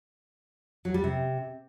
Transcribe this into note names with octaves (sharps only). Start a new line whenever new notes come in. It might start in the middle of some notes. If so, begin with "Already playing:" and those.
F#3
G3
C3